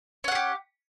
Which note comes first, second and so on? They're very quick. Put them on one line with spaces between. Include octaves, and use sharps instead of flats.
C#4 F#5 G#4 G4